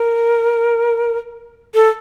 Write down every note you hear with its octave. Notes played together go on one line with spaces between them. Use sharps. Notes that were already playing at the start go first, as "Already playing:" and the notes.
Already playing: A#4
A4